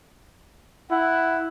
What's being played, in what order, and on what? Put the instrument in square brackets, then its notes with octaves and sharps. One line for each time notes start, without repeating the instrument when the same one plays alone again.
[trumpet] E4 [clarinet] F#5